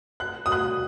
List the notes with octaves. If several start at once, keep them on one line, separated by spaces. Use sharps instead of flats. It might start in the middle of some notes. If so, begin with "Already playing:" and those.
F#6
D#6
F#6